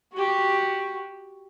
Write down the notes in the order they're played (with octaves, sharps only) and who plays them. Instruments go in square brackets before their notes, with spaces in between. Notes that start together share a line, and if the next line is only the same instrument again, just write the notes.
[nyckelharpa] F#4 G4